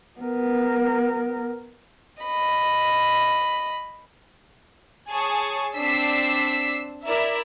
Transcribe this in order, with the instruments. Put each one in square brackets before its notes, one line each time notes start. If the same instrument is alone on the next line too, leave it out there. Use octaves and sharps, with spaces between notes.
[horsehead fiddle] B3 A#4
[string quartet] D#5 B5
[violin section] G#4 C#5 A5 C#6
C4 D4 E6 B6 C7
E4 A#4 D5 E5